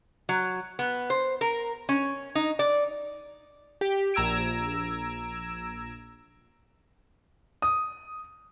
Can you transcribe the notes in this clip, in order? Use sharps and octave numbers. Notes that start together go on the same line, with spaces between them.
F#3
B3
C5
A#4
C#4
D#4
D5
G4
A#1 A#5 E6 G#6 D7
D#6